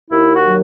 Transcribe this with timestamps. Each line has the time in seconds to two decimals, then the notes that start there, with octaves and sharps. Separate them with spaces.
0.11 D#2 E4
0.34 F#4
0.45 F#3